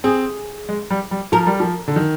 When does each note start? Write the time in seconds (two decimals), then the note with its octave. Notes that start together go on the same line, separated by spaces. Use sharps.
0.04 C4 G#4
0.69 G#3
0.90 G3
1.11 G3
1.32 F3 A#4
1.47 G3
1.60 F3
1.88 D3
1.96 D#3